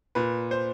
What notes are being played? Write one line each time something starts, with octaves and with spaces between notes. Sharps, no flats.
A#2 B4
C5